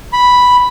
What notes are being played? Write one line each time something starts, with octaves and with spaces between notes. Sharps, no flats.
B5